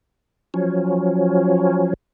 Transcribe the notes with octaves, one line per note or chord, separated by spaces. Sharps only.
F3 F#3 C#4